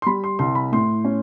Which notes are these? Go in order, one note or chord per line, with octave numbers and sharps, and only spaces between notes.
C6
G3 B5
C6
C2 C6
B5
A2 C6
C#4